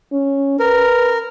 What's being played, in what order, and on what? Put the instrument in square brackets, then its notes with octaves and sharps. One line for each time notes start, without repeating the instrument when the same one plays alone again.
[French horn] C#4
[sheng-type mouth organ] A#4 [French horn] B4